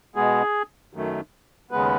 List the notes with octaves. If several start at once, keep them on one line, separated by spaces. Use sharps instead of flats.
B2 G#3 B3 G#4
F#2 D#3 F#3 A3
D#2 C#3 G#3 B3 B4